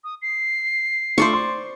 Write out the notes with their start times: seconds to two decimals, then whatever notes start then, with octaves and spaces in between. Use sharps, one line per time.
0.04 D#6
0.22 C7
1.18 A3 D4 F4 C5 D5 C#6
1.33 C6